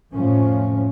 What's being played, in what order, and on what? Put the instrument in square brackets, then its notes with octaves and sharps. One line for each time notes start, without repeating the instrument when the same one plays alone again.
[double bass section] F2 A2 F3 C#4